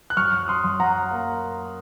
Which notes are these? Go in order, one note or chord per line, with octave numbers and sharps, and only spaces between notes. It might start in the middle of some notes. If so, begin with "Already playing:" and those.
F#6
F#2 C#6 F6
C6 D#6
F#2
F#5 A#5
A#3